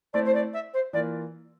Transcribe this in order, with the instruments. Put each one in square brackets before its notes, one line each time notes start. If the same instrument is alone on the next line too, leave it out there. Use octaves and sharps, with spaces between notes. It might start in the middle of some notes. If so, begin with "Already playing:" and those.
[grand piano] A3 C4 E4 [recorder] D5
[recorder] C5
D5
E5
C5
[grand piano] E3 A#3 F4 A#4 [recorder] D5